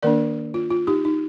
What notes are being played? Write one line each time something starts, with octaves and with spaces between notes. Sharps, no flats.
D#3 A#3 D4 A#4 D5
F4
F4
D#4 G4
D#4